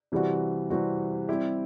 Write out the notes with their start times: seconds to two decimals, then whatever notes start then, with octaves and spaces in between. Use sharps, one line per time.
0.12 C3 E3 G3 C4 F#4
0.70 C3 E3 G3 C4 F#4
1.29 G3 C4 E4 G4